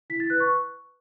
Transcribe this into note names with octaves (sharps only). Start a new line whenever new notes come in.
E4 B6
A6
B4 F#6
C#6